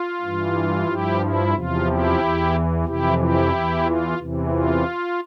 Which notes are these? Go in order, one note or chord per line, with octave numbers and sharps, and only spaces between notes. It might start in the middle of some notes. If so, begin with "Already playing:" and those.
Already playing: F4
G2 E3
G2 F3 E4 G4
E4
E2 C3 F3 F4
E4 G4
E2 E3
F2 C3 E3 E4 G4
E4 G4
E2 E3
F4
E2 C3 E3
F4